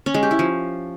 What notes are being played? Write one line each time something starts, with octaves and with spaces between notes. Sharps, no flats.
C#4
G#3
G4
E4
F3